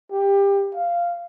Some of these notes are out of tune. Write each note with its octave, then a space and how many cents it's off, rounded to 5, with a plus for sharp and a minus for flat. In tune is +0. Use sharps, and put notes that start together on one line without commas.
G4 +20
F5 -10